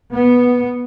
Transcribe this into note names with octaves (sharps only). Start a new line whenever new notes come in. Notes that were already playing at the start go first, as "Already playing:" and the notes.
B3